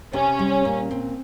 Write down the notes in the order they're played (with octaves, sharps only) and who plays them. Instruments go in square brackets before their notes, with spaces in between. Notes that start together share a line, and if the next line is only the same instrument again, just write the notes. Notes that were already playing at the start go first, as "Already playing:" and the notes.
[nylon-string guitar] C3 [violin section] C#4
[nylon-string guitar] G3
A#2
C4